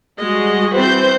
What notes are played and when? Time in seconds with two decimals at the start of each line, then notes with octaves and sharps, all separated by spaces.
0.19 G3 G#3 F#4 G#4 D#5
0.75 E3 C4 B4 C5 G6